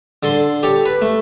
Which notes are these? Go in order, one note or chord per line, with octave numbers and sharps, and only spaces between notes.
D3 A4 C6
G4 A4 C#5
B4
A3